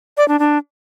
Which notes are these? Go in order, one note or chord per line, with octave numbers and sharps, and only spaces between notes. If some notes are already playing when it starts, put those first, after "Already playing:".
D5
D4
D4